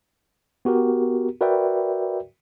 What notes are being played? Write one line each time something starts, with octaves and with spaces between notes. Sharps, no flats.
B3 F#4 G4 A#4
F#4 A#4 B4 D5 E5 G5